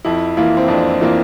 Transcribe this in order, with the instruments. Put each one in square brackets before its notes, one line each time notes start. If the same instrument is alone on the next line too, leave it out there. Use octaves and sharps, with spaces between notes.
[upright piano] F2 [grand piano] E4
[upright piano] E3 A#3 F4 [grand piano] E4
[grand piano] C4
[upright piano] F2 [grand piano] D4
[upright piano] E3 A#3 F4